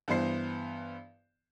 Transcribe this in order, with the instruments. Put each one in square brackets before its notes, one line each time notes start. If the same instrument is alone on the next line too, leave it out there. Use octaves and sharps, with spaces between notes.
[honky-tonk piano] G2 E3 B3 C5 C7